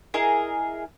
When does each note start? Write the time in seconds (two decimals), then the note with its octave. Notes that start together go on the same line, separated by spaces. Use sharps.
0.14 E4 G#4 A#4 D#5